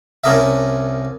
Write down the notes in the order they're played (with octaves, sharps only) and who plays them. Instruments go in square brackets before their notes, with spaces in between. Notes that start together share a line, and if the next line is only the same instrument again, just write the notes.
[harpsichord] C2 C#4 D4 A#4 D#5 E5